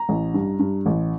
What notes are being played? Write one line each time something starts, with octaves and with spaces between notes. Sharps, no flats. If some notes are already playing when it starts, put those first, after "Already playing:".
Already playing: A#5
A1
G2
G2
A1